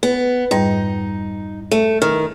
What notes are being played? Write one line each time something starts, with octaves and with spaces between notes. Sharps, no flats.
B3
F2 G#2 G3 D#4
A3
D#3 F6